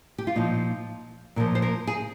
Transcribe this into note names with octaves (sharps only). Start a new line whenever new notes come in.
G4
F4
A#2 F3 D#4
A#2 F3 A#4
C5
A#4
G#4